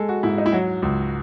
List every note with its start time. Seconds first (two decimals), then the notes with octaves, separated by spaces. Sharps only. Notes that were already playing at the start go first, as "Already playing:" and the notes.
Already playing: G#3 A4
0.09 F#4
0.23 G#2 E4
0.38 D#4
0.46 E4
0.52 F#3 F#4
0.82 C#2